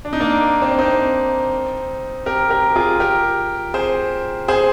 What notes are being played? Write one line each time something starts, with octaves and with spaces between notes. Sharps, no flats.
D4
D#4
A#3 D4
C4
D4
C4 D#4
G4 A#4
G4 A#4
F4 G#4
G4 A#4
G#4 C5
G#4 C5